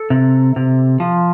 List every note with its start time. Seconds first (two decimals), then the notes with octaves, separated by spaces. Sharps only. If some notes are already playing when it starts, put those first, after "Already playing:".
Already playing: A4
0.10 C3
0.56 C3
1.00 F3